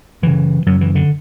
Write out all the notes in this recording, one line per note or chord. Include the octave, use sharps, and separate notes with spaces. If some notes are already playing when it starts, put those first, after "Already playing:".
F#2 C#3 E3
F#2 C#3 F#3
E3
D3